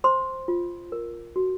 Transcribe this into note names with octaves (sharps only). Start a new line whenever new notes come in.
C5 C6
F4
A#4
F#4